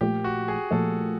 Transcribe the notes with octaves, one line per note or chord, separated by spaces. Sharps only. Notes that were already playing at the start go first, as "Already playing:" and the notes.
A#2 F3 A3 G4
F#4
G#4
A#2 F3 A3 A4